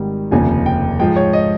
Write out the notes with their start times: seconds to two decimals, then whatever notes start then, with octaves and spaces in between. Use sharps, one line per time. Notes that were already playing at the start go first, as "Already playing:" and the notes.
Already playing: G#1 G#2 D#3 G3
0.31 F1 D#2 C#3 F3 G#5
0.66 G5
0.99 G#2 F3 G#3 G5
1.16 C#5
1.33 D#5